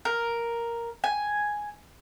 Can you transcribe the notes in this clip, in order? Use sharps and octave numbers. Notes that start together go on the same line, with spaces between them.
A#4
G#5